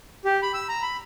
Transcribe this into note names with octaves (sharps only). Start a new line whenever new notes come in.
G4
B5
E6
A#5
B5